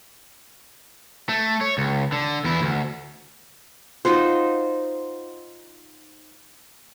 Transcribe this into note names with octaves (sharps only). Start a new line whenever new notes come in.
A3
C#5
C#2
D3
E2 E4
D2
D#4 F4 F#4 C5